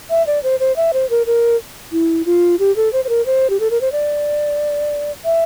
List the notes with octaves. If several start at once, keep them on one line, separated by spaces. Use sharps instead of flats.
E5
D5
C5
C5
E5
C5
A#4
A#4
E4
F4
G4
A4
C5
C5
A#4
C5
G4
A4
A#4
C5
D5
E5